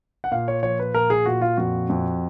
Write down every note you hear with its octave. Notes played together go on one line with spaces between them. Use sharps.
F#5
A#2 F5
C#5
F3 C#5
B4
A#2 A#4
G#4
A#2 F#4
F4
F2 F#4
F2